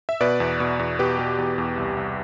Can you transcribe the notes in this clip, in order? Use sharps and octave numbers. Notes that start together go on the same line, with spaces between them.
E5
B2 B4 D5
E2
B2
E2
B2 G4 B4
B2
E2
E2
C2
C2